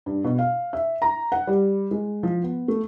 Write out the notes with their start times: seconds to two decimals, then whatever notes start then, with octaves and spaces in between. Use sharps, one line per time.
0.06 G2
0.24 B2
0.38 F5
0.73 E5
1.02 A#5
1.32 F#5
1.47 G3
1.91 G#3
2.23 F3
2.43 B3
2.68 A3